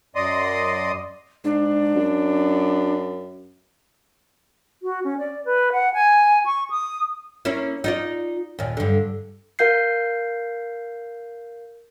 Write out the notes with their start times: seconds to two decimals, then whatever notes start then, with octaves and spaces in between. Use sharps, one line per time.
0.15 F#2 D5 D#5 C6 D#6
1.44 G#2 D4
1.95 F#2
4.83 F#4
5.04 C#4
5.18 D5
5.45 B4
5.72 F#5
5.94 G#5
6.46 C#6
6.70 D#6
7.45 A#3 C#4 E4
7.84 D#4 F4 D5
8.59 D#2 A#2
8.77 G2 D3
9.59 A#4 F5 G6 C7